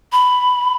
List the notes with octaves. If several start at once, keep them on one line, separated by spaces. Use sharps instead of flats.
B5